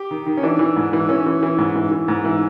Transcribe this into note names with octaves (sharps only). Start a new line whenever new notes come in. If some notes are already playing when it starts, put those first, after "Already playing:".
Already playing: G4
D#3
D#3
C#4
E3 D4
E3
G#2
E3
E3 C#4
E3
E3
G#2
E3
E3
G#2
E3